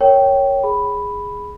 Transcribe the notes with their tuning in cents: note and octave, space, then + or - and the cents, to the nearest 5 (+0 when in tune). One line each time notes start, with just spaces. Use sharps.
A#4 -15 C#5 -5 G5 -10
G#4 -5 B5 +0